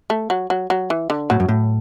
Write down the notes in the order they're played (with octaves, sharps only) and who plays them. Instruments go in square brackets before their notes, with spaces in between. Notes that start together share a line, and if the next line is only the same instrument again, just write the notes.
[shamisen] A3
F#3
F#3
F#3
E3
D3
[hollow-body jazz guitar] A2 [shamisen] F#3
[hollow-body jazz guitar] F#2
A2